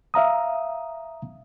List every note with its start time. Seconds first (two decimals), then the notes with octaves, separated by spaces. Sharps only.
0.14 E5 F5 A#5 D#6